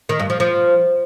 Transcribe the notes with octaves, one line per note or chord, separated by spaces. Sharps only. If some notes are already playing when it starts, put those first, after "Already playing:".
D#3
G2
F3
F3